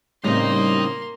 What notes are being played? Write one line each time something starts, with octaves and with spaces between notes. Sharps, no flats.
A2 C#3 G3 A#3 C4 D#4 D#5 C6